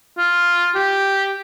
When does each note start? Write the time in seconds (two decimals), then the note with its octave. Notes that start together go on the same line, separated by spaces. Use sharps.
0.18 F4
0.75 G4